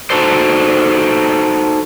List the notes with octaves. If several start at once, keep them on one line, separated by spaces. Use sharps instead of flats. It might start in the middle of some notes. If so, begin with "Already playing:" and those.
D#4 F#4 A4 C5